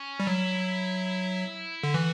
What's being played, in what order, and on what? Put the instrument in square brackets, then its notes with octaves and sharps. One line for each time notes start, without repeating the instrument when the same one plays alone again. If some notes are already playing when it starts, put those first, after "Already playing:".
Already playing: [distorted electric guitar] C#4
[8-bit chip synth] G3
[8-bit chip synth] F#3 [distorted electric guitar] E4
[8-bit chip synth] D3
[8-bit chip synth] E3 [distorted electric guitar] F#4